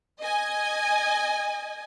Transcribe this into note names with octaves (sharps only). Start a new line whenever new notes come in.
D#5 G#5